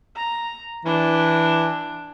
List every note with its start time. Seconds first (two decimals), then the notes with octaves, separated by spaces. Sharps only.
0.16 A#5
0.85 E3 D4